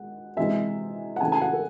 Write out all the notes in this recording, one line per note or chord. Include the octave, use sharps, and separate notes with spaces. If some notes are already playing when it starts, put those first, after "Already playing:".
Already playing: G#3 F#5
C3 E3 G#3 E5
F#5
C#3 E3 A3 G#5
G#5
F#5
A4